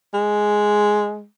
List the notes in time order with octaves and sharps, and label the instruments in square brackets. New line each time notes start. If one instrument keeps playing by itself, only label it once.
[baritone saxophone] G#3